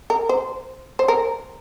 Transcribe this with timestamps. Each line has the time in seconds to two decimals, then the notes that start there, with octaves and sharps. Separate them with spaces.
0.10 A#4
0.29 C5
0.99 C5
1.08 A#4